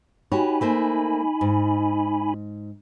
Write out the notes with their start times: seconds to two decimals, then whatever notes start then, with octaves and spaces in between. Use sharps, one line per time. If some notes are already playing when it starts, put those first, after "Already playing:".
0.32 D#4 F#4 G4 C#5 G#5 B5
0.61 A3 A#3 C5
1.41 G#2